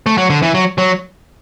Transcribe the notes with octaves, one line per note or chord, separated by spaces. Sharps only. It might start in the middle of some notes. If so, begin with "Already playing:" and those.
A3
F#3
D3
E3
F#3
F#3